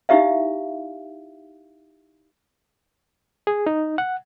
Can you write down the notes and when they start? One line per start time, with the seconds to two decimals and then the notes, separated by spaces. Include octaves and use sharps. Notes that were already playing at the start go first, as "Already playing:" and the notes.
0.09 D#4 E4 G4 E5 F5
3.47 G#4
3.66 D#4
3.98 F#5